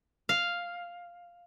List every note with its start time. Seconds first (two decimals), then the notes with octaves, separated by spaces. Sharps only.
0.29 F5